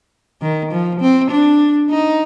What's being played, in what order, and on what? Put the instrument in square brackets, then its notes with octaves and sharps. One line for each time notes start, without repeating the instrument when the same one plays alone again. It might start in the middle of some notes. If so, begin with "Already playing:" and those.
[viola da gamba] D#3
F3
C4
D4
D#4